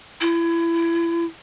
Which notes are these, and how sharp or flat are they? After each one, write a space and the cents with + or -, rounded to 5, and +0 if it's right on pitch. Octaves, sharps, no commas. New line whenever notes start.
E4 +30